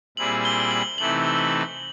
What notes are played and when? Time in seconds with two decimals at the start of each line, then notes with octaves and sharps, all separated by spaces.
0.17 A#2 G3 C4 E4 G#4 F#7
0.45 G7
0.60 G7
0.71 F#7
0.98 C3 E3 A3 C4 D#4 F#7